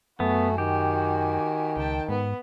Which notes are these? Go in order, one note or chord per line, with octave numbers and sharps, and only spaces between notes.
F#2 A3 B3 F#4 G#5
D#3 G4
C#2 G5 A5
G#2 B3